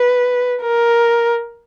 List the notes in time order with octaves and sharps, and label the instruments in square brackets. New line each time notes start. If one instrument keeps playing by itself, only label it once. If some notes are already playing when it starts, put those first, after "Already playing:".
Already playing: [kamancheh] B4
A#4